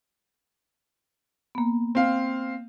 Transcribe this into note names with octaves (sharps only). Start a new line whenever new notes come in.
A#3 B3
C4 F5